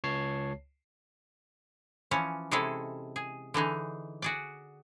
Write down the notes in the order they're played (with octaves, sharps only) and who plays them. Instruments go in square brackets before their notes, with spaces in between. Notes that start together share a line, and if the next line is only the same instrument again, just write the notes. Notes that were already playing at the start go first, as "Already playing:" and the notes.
[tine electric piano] C#2 C#5 A5 C7
[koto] E3 F3 C#4
C3 G#3 C#4 E4 G#4 A4
G#4
D3 E3 D#4 G#4
F#4 G#4 D5